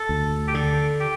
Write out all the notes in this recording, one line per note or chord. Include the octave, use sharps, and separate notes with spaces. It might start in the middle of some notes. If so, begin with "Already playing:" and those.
Already playing: A4
D2
G4
D3 A4
G4